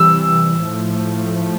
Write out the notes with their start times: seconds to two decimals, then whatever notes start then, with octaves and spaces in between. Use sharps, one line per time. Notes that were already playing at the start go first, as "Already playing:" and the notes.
Already playing: C3 E3 G3 E6
0.61 A2 F3 A3